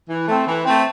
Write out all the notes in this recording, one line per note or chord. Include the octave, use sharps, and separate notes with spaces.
E3
A3 C4
E3
A3 C4